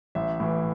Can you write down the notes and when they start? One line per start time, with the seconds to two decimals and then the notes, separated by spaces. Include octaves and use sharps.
0.15 A1 E5
0.40 A2 E3